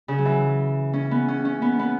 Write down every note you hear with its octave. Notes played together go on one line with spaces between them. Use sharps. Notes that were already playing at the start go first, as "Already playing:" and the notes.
C#3
F#3
E3
C#4
B3
C#4
C#4
B3
B3